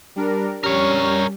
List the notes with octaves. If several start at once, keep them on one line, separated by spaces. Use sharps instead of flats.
G3 D4 A#4
G3 C#4 A#4 C#5